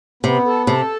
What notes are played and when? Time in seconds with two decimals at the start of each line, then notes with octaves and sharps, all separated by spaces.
0.23 C3 B3
0.45 A4
0.67 C3 A4